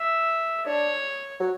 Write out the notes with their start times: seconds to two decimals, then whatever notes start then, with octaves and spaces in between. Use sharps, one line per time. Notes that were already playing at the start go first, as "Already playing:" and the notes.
Already playing: E5
0.66 D4 C#5
1.40 F#3